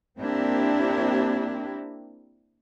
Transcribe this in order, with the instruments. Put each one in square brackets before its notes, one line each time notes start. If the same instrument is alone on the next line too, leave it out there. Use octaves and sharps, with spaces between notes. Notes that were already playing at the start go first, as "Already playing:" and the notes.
[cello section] A#3 C4 D4 E4 G4